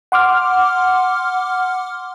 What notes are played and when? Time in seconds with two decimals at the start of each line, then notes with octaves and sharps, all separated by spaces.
0.12 F#5 C6 D6 F6